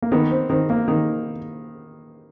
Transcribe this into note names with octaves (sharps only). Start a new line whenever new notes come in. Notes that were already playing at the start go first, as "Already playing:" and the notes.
A#3
D#3 B3
C4
D#3 C4
A#3
D#3